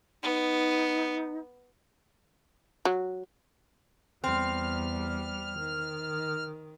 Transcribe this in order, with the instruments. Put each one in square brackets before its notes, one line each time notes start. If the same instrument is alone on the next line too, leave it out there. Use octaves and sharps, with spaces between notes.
[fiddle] B3 [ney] D#4
[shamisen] F#3
[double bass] E2 G3 [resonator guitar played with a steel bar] C4 [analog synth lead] F6
[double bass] D#3